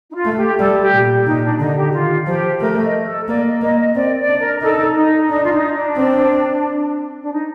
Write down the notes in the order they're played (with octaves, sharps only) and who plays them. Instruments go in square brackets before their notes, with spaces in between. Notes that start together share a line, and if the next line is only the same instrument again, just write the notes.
[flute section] D#4
F4
[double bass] A3
[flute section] G4
[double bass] G3 [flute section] A4
[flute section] G4
[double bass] A#2
[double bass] A#2 [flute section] D#4
[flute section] D4
[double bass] D3 [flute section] D#4
[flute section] G4
[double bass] D#3 [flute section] F4
[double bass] F3 [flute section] G4
[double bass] A3 [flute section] A#4
[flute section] D#5
A4
[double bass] A#3 [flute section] D5
[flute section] D#5
[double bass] A#3 [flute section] D#5
[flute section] D#5
[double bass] C4 [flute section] D5
[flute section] D5
[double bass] D4
[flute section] A#4
[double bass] D#4 [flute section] A4
[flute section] D#4
[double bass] D4 [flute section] D#4
[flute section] F4
D#4
D4
[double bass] C4
[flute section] D4
D#4